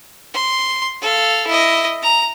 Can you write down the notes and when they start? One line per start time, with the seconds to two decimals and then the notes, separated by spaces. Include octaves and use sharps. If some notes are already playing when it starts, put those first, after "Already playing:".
0.33 C6
1.02 A4 F5
1.47 E4 D#5
2.02 A#5